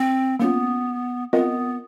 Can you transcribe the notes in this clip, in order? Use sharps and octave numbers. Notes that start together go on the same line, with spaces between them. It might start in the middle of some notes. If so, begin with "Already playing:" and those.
Already playing: C4
A#3 B3 C#4 F4
B3 C4 F4 A#4 D#5 F#5